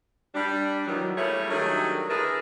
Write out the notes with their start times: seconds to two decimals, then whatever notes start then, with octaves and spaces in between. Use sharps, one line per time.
0.35 G3 D4
0.87 D#3 E3 F#3
1.16 G3 A3 A#3 E4 G#4 C#5
1.50 D#3 F#3 G3 A3 D4 G#4
2.10 D3 D4 E4 G#4 A#4 B4